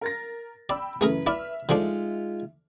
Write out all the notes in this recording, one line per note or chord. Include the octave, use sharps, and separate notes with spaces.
A#4 A6 A#6
D5 G5 B5 E6
F#2 C#3 E3 A3 G#4 A#4 B4
E4 D5 E5 F6
D3 F3 G#3 D4 D#4 F4